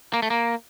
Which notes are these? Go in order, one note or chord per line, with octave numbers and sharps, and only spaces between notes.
A#3
A3
A#3